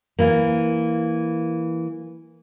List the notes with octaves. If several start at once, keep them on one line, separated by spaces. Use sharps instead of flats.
E3 A#3